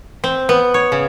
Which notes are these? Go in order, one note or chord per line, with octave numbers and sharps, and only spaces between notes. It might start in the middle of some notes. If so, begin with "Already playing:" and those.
C4
B3
C#5
C#3